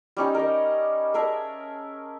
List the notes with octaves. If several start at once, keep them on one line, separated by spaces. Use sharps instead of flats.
G3 C#4 D#4
A#4 D#5
G#4 A#4 E5 A5